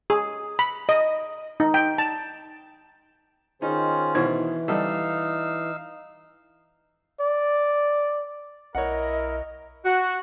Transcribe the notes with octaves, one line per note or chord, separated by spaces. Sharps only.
G#4
B5
D#5
D#4
G5
A5
D#3 C#4 D#4 F4 G#4 C5
B2 D#3 E3 E4 C5
G3 D#4 A4 D#5 F5 E6
D5
B1 E4 A#4 C#5 D#5 F#5
F#4